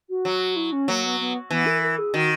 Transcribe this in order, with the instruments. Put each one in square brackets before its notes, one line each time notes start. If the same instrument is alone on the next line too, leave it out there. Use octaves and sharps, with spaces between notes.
[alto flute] F#4
[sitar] F#3
[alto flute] E4
C#4
[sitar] F#3 [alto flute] A#3
[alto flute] B3
B3
[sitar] E3 [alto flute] B3
[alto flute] A#4
A#4
G#4
[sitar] D#3 [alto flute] F#4